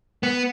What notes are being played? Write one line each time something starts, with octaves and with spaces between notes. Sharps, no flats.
B3